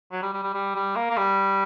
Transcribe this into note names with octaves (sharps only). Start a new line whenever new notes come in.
F#3
G3
G3
G3
G3
G3
A#3
A#3
G3